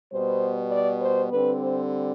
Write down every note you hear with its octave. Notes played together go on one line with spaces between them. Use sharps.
B2 G3 B3 C5
D5
C5
D3 G3 C4 B4
C5